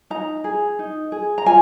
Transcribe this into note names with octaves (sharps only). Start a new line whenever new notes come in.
D#4 A#5
G#4
D#4
G#4
A#5
F4 G#5